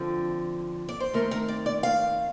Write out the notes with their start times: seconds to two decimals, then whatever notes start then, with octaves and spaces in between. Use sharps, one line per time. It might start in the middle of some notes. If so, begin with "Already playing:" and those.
Already playing: D3 F3 C4
0.89 D5
1.00 C5
1.13 D#3 A3 C4 A#4
1.31 A#4
1.48 D5
1.66 D5
1.83 F5